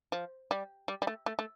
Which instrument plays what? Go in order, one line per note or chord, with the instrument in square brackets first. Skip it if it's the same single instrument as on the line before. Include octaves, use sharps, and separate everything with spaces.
[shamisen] F3
G3
G3
G3
A3
A3
A3